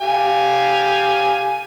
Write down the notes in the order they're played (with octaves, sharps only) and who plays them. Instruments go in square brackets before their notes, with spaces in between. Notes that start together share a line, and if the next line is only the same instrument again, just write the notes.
[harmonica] G4 F5 G#5